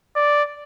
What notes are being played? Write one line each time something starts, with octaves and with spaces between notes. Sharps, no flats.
D5